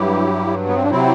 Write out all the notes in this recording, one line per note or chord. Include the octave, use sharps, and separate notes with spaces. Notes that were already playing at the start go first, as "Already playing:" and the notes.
Already playing: G2 F#3 E4 G4
B3
C4
D4
C3 F#3 C4 E4